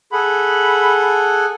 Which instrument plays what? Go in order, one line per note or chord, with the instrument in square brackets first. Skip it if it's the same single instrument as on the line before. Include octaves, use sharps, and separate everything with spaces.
[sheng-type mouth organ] G#4 A4 F#5 [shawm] B5